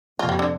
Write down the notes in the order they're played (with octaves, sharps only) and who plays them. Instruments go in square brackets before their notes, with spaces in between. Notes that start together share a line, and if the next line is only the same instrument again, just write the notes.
[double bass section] F2 C3 A#3 [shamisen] F4
[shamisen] G3
D3